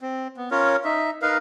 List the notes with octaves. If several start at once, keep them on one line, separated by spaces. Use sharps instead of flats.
C4
B3
C#4 F4 A#4 C#5
D#4 E5
D#4 A#4 B4 F5